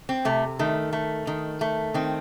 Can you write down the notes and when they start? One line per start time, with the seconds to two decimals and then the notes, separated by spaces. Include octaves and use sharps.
0.09 C4
0.25 C3 A3
0.59 D#3 A3
0.93 A3
1.27 D#3
1.61 A3
1.94 D#3 C4